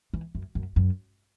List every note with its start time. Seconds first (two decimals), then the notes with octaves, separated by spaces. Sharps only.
0.14 E3
0.35 F#2
0.55 F#2
0.76 F#2